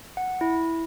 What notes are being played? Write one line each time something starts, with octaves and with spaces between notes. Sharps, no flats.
F#5
E4